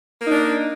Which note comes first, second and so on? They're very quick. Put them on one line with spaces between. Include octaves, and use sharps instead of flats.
A#3 D#4 D4